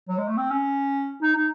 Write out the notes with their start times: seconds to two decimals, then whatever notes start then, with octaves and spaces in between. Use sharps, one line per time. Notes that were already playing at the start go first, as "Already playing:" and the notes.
0.08 F#3
0.18 G#3
0.28 A3
0.37 C4
0.51 C#4
1.22 D#4
1.36 D#4